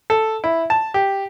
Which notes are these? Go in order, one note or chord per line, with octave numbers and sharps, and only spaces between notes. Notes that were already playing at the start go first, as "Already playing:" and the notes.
A4
E4
A5
G4